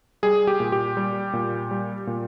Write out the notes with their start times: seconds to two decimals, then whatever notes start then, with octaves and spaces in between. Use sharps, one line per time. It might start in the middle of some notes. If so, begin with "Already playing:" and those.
0.23 G3 G#4
0.47 G4
0.60 A#2
0.72 G4
0.97 G3
1.33 A#2
1.71 G3
2.07 A#2